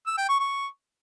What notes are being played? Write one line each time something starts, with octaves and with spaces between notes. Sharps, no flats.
E6
G5
C#6
C#6